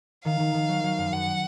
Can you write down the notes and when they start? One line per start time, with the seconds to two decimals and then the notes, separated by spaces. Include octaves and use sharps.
0.25 D#3 F5
0.39 D#3
0.54 D#3
0.68 F#3
0.83 F#3
0.98 F#2
1.12 F#2 F#5